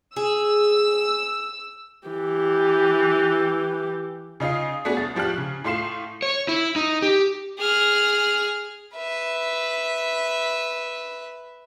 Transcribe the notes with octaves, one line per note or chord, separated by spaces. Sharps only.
G#4 E6
E3 G4
C#3 D#4 F4 D#6 C7
A3 B3 C#4 D4 F#4 G#4
C2 A6
A2 F3 G4 A5 F6 F#6
C#3
A2 A3 F4 C6 C7 E7
C#5
E4
D#4
G4
G#4 F6
B4 E5